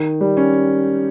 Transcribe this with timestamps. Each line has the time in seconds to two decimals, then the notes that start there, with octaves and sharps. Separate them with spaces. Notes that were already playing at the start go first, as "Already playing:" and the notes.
Already playing: D#3
0.21 G3
0.37 C#4